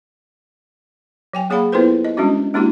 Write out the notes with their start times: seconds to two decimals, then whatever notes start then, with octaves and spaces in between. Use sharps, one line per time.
1.33 F#3 G5 G#5
1.50 A#3 G#4 C#5 F5 F#5 B5
1.72 B3 E4 F4 A4 B4 C5
2.05 D#5
2.17 G3 G#3 C#4 D4 F#4
2.54 G#3 A#3 D4 E4 F#4 G4